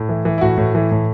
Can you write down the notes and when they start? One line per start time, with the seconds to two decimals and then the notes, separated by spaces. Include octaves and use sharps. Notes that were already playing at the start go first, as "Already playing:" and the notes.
Already playing: A2
0.09 E3
0.25 E3
0.38 E4
0.41 A2 F#4
0.58 A2
0.75 E3
0.91 A2